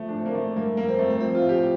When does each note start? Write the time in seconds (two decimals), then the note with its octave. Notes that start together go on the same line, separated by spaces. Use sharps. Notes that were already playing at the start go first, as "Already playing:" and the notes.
Already playing: F3 A3
0.09 D4
0.13 A2 C4
0.26 A#3
0.35 E3 A3
0.56 G2 A#3
0.77 F2 A#3
0.89 C4
0.99 F2 A3
1.10 C4
1.20 F3 C4
1.35 F4
1.42 A2
1.49 G4